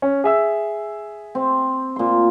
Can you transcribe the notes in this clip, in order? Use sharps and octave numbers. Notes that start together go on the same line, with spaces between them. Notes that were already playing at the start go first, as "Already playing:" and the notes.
C#4
G#4 E5 E6
C4
A#2 C6